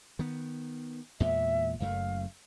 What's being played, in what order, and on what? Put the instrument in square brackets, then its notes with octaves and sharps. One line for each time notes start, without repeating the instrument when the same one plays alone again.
[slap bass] D#3 B3
[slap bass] E2 A#2 G#3 [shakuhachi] E5
[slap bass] F#1 F#2 A3 [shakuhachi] F5